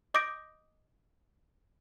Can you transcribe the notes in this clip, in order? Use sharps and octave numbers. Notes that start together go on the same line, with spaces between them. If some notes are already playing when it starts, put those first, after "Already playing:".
D#5 D6 D#6 G6 A#6 D7